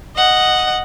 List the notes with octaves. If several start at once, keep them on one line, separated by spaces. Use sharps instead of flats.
D#5 F#5